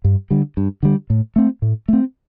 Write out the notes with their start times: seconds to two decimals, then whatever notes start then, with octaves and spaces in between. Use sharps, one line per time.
0.04 G2
0.31 D3 G3
0.57 G2
0.83 D3 G3
1.10 A2
1.36 A3 C4
1.62 A2
1.88 A3 C4